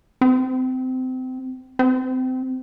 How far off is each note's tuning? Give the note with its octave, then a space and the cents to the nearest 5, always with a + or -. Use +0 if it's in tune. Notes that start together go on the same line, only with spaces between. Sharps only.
C4 -25
C4 -25